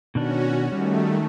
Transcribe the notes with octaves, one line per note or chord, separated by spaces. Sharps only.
B2 D#3 C#4 D4 F#4
D#3 G3 A3